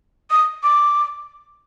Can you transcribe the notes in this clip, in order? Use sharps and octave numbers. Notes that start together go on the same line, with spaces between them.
D#6
D6